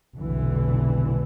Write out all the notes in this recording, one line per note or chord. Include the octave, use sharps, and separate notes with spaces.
F1 B1 D3 E3